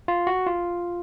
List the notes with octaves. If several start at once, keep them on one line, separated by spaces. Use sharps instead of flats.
F4
F#4
F4